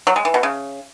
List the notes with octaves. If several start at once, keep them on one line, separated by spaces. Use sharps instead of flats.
F#3
G#3
E3
B2
C#3